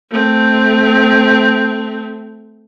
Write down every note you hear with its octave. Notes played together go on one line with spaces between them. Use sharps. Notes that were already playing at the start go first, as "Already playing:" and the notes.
A3 C4